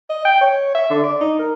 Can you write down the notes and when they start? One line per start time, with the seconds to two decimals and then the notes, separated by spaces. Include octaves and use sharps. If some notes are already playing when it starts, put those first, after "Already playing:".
0.10 D#5
0.25 G5
0.41 C#5
0.75 E5
0.90 D3
1.04 D5
1.21 D#4
1.39 A#4